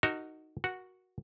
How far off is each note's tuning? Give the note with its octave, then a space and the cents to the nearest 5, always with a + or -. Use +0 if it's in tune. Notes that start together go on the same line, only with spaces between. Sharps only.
D#4 +0 F#4 +0 A#4 -40
F#4 -5 A#4 +20 F#5 -5